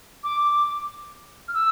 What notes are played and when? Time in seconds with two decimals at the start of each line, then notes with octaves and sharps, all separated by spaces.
0.23 D6
1.48 F6
1.54 E6